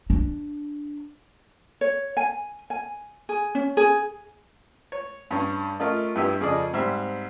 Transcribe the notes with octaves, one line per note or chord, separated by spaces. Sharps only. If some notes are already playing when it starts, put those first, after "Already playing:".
D4
C#5
G#5
G#5
G#4
C#4
G#4
C#5
G2 C#4
A3 C#4 F4 A#4 D#5
G2 B3 E4 G4 E5
F2 C#3 G#4 A4 D5 D#5
G#2 G3 C4 E5